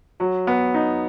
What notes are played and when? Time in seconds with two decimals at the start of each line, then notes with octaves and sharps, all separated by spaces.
0.20 F#3
0.47 B3
0.74 D#4